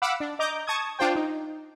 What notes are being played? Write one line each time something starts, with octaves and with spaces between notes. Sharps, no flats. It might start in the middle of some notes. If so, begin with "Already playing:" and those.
F5 F#5 B5 D6 E6
D4
D#5 A#5 D6 G6
A5 C#6 D#6 G#6
D4 F4 C5 G5
D#4